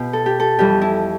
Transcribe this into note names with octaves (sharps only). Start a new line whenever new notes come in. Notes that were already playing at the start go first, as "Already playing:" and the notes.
Already playing: B2 F4 G4
A4
G4
A4
F2 E3 G3 G4
E4